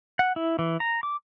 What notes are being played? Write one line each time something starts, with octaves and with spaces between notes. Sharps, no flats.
F#5
E4
E3
A#5
D6